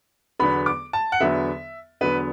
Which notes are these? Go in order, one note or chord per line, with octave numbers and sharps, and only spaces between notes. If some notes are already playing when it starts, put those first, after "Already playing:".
E2 D3 F#3 B3 B5
D6
A5
F#5
E2 D3 F#3 B3 E5
E2 D3 F#3 B3 B4